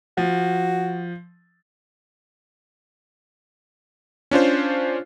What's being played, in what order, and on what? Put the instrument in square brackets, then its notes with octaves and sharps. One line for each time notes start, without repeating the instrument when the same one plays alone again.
[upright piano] F3 [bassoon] F#4
[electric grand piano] C#4 D4 F4 C5